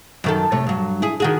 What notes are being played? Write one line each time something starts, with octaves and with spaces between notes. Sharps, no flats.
F#2 D#3 A4
C3 A3 C#5
G2 F#3
E4 G#4
D#3 F#4 G#4